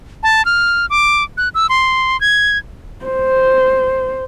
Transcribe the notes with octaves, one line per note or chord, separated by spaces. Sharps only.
A5
F6
D6
F#6
E6
C6
G#6
C5